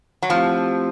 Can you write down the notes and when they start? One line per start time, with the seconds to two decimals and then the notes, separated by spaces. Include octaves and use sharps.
0.23 F#3
0.29 F3 A3 C4 E4 G4